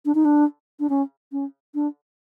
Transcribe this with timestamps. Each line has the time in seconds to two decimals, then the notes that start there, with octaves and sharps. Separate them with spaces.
0.05 D4
0.15 D#4
0.25 D4
0.80 D4
0.89 C#4
1.32 C#4
1.75 D4